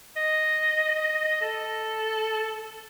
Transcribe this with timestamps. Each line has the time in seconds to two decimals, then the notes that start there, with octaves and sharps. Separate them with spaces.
0.17 D#5
1.41 A4